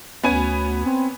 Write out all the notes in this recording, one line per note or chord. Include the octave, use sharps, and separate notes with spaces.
D2 B3 C#4 G#5
C4